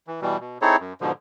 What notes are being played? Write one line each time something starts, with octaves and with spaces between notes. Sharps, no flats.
E3
B2 E3 G3
B2
C4 D#4 E4 G#4 A4 C#5
F#2
G#2 B2 D3 F3